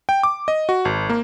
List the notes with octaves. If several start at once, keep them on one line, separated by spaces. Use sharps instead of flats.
G5
D6
D#5
F#4
G#1
A#3